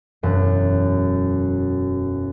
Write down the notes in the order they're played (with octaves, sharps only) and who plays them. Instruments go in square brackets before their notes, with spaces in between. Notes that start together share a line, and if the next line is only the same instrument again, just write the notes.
[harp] E1 F#2